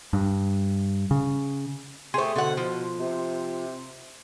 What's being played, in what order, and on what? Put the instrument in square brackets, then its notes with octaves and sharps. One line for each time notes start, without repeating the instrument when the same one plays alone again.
[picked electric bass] G2
C#3
[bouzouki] A3 G#4 [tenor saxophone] G4 [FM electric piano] C5 C6
[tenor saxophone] B2 [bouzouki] D3 F#5
[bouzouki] F3
[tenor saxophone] C3